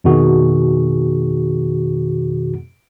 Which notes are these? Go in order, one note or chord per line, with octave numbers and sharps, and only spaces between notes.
F2 B2 D#3 F#4 G#4